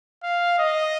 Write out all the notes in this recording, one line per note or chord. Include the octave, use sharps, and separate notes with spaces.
F5
D#5